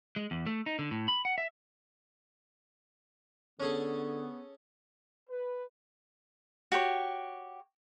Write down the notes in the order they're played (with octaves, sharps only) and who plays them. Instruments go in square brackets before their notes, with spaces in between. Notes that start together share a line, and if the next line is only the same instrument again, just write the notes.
[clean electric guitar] G#3
E2
A3
D#4
D3
A2
B5
F#5
E5
[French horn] D3 [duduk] B3 [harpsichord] C#4 G#4 A4
[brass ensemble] B4
[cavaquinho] F#4 G4 B4 C#5